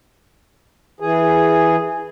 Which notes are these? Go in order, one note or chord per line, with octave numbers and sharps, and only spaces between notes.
E3 G#4